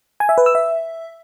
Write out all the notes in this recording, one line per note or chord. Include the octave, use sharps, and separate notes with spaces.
G#5
E5
B4
E6
E5